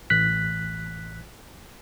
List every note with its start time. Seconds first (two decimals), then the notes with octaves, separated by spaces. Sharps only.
0.10 A1 F#6 B6